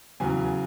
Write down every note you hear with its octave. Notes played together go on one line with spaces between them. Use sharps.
E2 C#3 F#3 G#5